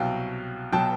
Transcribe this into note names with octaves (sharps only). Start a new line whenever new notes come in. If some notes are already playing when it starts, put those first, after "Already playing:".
Already playing: C2 B2 F#3 F5 G5
B2 F#3 G5 A5